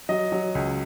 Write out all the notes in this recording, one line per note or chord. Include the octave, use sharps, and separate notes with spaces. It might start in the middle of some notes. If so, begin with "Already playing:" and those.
F#3 D#5
F#3
C#2